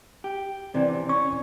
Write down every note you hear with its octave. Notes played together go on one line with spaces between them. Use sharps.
G4
C3 E3 D5
C#4 C#6